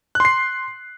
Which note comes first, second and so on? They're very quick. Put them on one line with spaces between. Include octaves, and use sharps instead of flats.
F#6 C6 C7